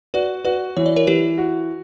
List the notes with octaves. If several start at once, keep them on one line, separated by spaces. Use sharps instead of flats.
F#4 B4 D5
F#4 B4 D5
E3 C#5
D5
A#4 C#5
E3 G4 B4
F#4